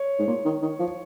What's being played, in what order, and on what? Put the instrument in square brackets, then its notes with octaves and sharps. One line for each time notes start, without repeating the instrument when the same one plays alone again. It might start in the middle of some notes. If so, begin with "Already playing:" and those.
Already playing: [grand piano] C#5
[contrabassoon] G#2
A#2
D#3
D#3
F3